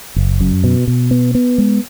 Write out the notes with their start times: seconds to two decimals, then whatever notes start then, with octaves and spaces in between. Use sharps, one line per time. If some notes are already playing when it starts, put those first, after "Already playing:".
0.16 F#1
0.41 F#2
0.64 B2
0.87 B2
1.11 B3
1.35 B3
1.58 G#3